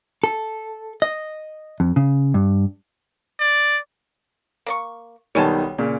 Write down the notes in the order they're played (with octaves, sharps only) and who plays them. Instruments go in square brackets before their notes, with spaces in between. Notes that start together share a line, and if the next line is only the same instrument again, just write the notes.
[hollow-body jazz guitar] A4
D#5
F2
C#3
G2
[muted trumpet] D5
[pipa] A#3 D5 C#6
[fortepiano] B1 D#3 G3 [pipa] C#5 G#5 A5
[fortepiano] A#2 C#3